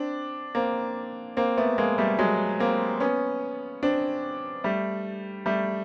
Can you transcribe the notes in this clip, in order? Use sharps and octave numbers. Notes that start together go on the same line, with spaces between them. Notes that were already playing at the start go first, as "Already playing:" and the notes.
Already playing: C4 D4
A#3 C4
A#3 C4
A3 B3
G#3 A#3
G3 A3
F#3 G#3
A#3 C4
B3 C#4
C4 D4
G3 A3
G3 A3